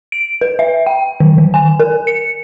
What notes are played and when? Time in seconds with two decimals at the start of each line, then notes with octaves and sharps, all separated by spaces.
0.12 D7
0.41 B4
0.59 E5
0.87 G5
1.20 D#3
1.38 D#3
1.54 G#5
1.80 A#4
2.07 C#7